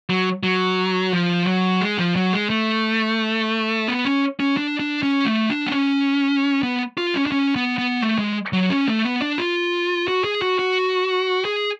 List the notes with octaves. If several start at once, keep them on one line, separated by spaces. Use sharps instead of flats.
F#3
F#3
F3
F#3
G#3
F3
F#3
G#3
A3
B3
C#4
C#4
D4
D4
C#4
A3
D4
B3
C#4
B3
F4
C#4
D4
C#4
B3
B3
A3
G#3
F#3
C#4
A3
B3
D4
F4
F#4
G#4
F#4
F#4
G#4